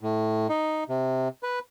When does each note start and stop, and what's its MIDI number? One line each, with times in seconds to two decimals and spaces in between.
0.01 0.47 45
0.49 0.84 63
0.89 1.28 48
1.43 1.59 71